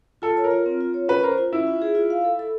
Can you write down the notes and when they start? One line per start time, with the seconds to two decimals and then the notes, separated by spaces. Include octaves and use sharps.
0.22 F4 A4
0.37 C#5
0.44 A#4
0.51 F4
0.66 C4
0.81 F4
0.94 C#5
1.08 C#4 B4
1.23 A#4 C5
1.38 F4
1.52 C#4 E4
1.67 F4
1.82 G#4
1.95 F4
2.10 F5
2.24 A4
2.39 A4